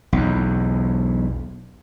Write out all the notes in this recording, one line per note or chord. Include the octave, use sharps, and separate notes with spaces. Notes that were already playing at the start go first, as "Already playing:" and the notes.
B1 E2